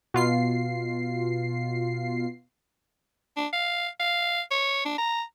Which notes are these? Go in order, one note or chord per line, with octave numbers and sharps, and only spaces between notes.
B2 F4 C7
D4
F5
F5
C#5
D4
A#5